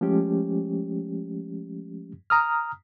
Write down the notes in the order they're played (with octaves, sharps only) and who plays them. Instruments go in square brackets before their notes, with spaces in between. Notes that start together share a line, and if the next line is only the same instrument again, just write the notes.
[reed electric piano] F3 G#3 A3 C#4 G4
A#5 D#6 F6